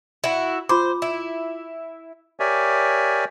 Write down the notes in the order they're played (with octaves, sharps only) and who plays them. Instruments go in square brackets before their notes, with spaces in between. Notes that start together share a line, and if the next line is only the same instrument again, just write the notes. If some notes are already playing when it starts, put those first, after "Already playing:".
[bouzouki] E4 F#4
[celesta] F4 B5 D6 [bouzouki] C5
[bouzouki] E4
[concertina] G4 A#4 C#5 D5 E5 G#5